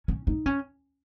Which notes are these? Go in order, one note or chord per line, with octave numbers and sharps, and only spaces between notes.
C#4
D#4
C#4